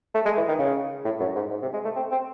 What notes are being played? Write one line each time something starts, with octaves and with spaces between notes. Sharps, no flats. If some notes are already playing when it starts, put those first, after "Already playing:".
A3
G#3
E3
D#3
C#3
A2
F#2
G#2
G#2
C3
G#3
A3
C4
C4